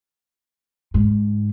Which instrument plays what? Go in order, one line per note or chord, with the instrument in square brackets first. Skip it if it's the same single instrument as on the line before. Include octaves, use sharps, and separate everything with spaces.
[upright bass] G#2